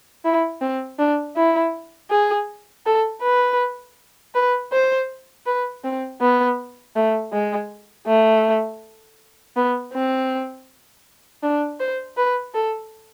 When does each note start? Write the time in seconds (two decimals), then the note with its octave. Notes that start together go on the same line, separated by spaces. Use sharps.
0.25 E4
0.61 C4
0.99 D4
1.36 E4
2.10 G#4
2.86 A4
3.23 B4
4.35 B4
4.72 C5
5.46 B4
5.84 C4
6.21 B3
6.96 A3
7.32 G#3
8.07 A3
9.56 B3
9.93 C4
11.43 D4
11.80 C5
12.17 B4
12.55 A4